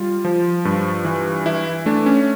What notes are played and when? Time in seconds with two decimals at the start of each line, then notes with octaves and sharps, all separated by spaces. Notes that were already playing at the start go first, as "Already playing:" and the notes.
Already playing: G3 F4
0.25 F3
0.65 G2
1.05 E3
1.46 E3 E4
1.86 A3 D4
2.06 C#4